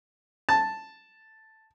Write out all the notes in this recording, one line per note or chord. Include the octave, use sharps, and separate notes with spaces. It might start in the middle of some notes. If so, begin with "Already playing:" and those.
A5